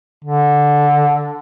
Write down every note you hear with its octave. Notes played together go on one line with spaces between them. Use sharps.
D3